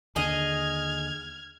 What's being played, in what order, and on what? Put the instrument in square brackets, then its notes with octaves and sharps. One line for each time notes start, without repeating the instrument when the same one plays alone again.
[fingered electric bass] D#2 D3 [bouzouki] G#4 D#5 [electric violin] F6 G#6